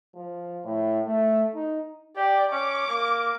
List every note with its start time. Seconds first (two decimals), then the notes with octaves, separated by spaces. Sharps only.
0.15 F3
0.64 A2
1.05 A3
1.55 D#4
2.16 G4 D5
2.52 C#4 D6
2.88 A#3